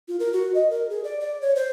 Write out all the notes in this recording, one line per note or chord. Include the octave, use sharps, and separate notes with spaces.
F4
A#4
F#4
D#5
A#4
G#4
D5
D5
C#5
C5